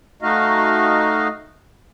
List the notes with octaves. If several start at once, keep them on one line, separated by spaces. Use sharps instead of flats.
A3 D#4 F#4 D#5 F5